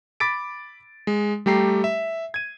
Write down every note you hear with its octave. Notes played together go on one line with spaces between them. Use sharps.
B5 D6 A6 B6 D7
G#3
G3 A3 G4 A#5 C7
E5
G#6 D#7